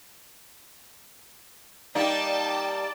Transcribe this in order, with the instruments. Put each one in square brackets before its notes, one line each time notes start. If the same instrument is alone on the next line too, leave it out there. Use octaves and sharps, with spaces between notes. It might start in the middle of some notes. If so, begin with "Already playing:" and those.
[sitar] G3 A#3 D#4 [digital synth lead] D5 [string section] G5 A5